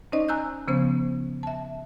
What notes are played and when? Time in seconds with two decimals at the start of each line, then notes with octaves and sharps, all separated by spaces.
0.12 C#4 D#4 C5 D5 D#5
0.28 G#5 A#5 E6 F#6 G6
0.68 C#3 F3 B3 C#4 C5
1.43 E5 A5